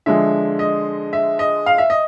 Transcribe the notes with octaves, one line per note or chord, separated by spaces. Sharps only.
D3 F3 G#3 E5
D#5
E5
D#5
F5
E5
D#5